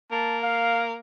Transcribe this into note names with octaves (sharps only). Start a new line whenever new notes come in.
A#3 A5
F5